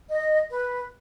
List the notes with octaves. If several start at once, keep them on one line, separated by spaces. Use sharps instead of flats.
D#5
B4